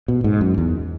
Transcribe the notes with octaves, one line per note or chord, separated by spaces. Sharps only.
B2
G#2
F#2
E2